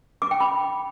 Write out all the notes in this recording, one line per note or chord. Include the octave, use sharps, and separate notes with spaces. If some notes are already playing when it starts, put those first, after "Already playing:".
D6
G5
B5